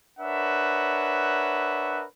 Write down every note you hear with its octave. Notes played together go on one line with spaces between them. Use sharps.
D4 A#4 B4 C#5 E5 F#5